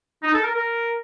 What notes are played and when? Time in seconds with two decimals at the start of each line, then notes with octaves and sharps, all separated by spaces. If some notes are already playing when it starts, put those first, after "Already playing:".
0.23 D#4
0.34 A4
0.44 A#4
0.54 A#4